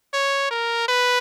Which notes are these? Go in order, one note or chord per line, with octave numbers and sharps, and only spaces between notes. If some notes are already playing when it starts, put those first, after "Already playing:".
C#5
A#4
B4